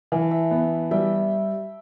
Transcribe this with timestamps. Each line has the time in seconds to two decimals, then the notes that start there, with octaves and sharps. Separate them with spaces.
0.12 E3 G5
0.21 A5
0.31 E5 G5
0.51 B3
0.91 G3 E5 G5